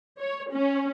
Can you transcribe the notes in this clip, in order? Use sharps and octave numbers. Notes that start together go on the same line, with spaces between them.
C#5
C#4